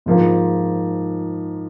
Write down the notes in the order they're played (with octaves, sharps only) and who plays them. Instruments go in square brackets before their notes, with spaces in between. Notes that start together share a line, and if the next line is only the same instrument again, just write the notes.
[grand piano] G#2 F3 A#3